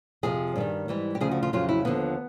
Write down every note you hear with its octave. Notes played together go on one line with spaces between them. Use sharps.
F2 C3 F3 G#4
G2 D#3 G3
G#2 E3 G3
G4
D2 C#3 F3 G#4
F#4
F4
F2 C#3 F#3 F4
E4
D#2 D3 F3 B3